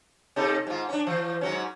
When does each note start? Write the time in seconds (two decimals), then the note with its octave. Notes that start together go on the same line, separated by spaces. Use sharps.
0.36 C3 D#4 A4
0.67 G#2 F4
0.88 C#4 D4
1.07 E3
1.41 G#2 F#3 C#4